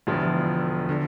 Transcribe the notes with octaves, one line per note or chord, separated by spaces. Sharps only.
E1 E2 D3 F3 A3
D3